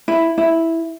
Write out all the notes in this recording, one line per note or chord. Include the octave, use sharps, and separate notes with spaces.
E4
E4